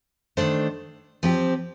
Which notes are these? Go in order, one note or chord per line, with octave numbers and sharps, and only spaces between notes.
D#3 A3 D4 A4 C5
F3 C4 G4